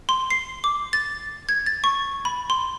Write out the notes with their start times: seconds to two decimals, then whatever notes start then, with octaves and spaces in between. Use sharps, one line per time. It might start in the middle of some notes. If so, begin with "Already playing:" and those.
0.09 C6
0.30 C7
0.64 D6
0.93 A6
1.49 G#6
1.66 A6
1.84 C#6
2.25 B5
2.50 C6